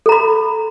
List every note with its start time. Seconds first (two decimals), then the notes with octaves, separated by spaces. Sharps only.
0.06 A4
0.09 A#5
0.12 B5